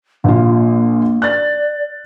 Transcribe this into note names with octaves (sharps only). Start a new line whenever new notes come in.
A#1 A#3 F4
D5 F#6 A6